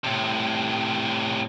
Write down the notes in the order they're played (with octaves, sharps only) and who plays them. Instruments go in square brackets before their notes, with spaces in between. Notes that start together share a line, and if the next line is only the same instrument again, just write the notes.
[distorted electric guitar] A2 C3